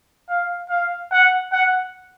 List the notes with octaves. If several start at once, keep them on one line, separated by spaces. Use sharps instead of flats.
F5
F5
F#5
F#5